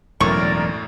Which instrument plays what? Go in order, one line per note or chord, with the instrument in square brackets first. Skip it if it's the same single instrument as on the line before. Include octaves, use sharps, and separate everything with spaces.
[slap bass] E1 F#3 [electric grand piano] F#2 A2 [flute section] A#4 D5 [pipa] C#6